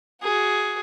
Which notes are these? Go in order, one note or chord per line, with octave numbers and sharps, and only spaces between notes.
F#4 G#4